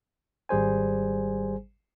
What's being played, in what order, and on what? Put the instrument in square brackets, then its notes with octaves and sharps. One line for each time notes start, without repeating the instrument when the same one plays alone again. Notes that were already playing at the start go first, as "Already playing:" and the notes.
[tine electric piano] G#1 G3 G#4 C5 G#5